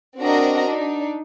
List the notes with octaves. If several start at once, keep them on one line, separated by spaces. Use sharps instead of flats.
C4 D4 F#4 A#4 D#5 A#5
D4 D#4